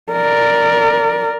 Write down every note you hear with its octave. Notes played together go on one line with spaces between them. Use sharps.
A#4 D5